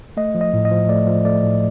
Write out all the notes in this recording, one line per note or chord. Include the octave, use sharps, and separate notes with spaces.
A3 D#5
F3
D#5
A2
D#5
F3
A3 D5
F3
A3 D5
A2